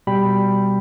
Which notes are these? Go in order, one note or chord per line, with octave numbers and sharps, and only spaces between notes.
B2 G3 G5 B5